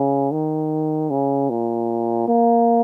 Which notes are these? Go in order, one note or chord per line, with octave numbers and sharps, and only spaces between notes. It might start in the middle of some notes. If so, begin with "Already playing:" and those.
Already playing: C#3
D#3
C#3
A#2
A#3